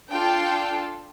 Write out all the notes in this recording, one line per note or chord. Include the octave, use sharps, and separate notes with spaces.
D4 F4 A4 G5